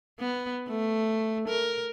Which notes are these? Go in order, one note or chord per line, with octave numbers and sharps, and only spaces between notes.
B3
A3
A#4